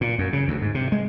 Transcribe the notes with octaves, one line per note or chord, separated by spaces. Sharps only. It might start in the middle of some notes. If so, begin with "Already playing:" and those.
A#2
F#2
C#3
D2
G#2
C3
G#3